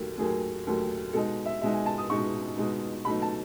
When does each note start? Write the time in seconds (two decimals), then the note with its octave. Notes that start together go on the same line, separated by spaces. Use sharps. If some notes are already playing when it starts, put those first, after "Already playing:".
Already playing: D#2 D#3 F#3 A3
0.18 D#2 D#3 F#3 A3 G#4
0.67 D#2 D#3 F#3 A3
1.13 B2 G#3 D#4 A4
1.46 E5
1.61 B2 G#3 D#4 E5
1.73 G#5
1.86 A5
1.98 D#6
2.10 B2 G#3 D#4 C#6
2.57 B2 G#3 D#4
3.05 B2 F#3 A3 D#4 B5
3.22 A5